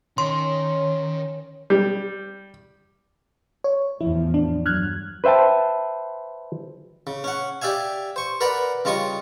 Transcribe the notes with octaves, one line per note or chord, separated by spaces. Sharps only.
D#3 C#4 C#5 C6
G3
C#5
E2 A2 F3 E4
D4
G2 F#3 F6 F#6 G#6
B4 C5 E5 G5 A5
C#3
C#4 F#5
G4 D5 E5 F5 G#5
C5 C#6
A#4 B4 D5 F#5 A#5 B5
C#3 G3 F4 D#5 C#6 D#6